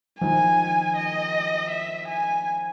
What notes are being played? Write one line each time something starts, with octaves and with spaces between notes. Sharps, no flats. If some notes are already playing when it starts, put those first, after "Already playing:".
D#3 F3 G#5
D#5
E5
G#5